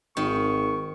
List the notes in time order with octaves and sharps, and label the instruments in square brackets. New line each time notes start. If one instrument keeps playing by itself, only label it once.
[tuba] G#1 [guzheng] D#3 [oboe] C#6